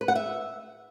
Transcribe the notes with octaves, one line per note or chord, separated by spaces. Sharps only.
B4
F#5
E5